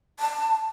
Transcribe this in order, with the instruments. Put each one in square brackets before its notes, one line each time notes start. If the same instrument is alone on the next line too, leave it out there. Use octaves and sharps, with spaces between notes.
[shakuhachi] A5